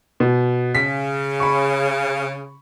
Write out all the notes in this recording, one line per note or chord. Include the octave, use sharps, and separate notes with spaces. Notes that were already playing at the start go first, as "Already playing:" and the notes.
B2
C#3 B6
B5 C#6